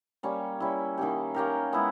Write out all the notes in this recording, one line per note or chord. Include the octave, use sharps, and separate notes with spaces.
G3 A#3 C#4
G3 C#4 E4
D#3 A#3 C#4 G4
A#3 C#4 G4 A#4
G#3 B3 E4